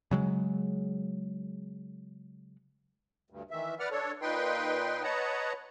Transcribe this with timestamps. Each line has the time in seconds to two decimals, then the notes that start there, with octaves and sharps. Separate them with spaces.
0.11 C#3 F#3 G#3
3.30 D2 G2
3.51 D#3 E3 E5
3.79 B4 D5 F#5 F6
3.91 D4 A4 C#5
4.22 A#2 D#4 B4 G5 C6
5.03 B4 C#5 D#5 F#5 A5 A#5